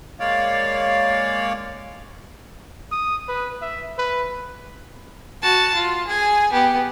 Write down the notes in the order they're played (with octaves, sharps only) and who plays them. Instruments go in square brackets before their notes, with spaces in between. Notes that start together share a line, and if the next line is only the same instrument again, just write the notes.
[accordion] G#3 A#3 C#5 D5 F5
[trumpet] D#6
B4
E5
B4
[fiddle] F#4 A5
F4
G#4 G#5
B3 G4